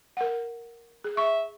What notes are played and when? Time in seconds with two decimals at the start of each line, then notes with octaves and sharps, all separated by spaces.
0.17 A#4 F#5
1.04 G#4
1.17 E5 C#6